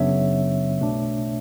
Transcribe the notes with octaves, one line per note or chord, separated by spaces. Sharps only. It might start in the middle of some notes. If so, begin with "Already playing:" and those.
Already playing: F#2 C#3 F#3 B3 D4 C#5 E5
B1 B2 A3 D4